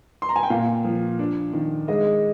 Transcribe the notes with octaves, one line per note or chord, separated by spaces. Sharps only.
C6
A#5
G#5
G5
A#2 F5
F3
D4
D#3
G#3 D#5